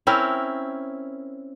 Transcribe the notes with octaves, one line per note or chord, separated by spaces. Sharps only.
C4 C#4 E4 A#4